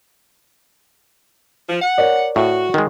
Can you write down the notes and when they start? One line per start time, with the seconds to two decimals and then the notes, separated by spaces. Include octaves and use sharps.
1.69 F3
1.82 F#5
1.98 A#4 C#5 D5
2.36 A2 F#4
2.74 D#3 G#3